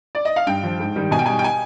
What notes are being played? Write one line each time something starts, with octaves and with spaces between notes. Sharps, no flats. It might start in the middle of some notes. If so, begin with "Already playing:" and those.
D5
D#5
F5
G2 G5
F3
G#2
D#3 G3
B2 G#5
G5
G3 G#5
G5
G#5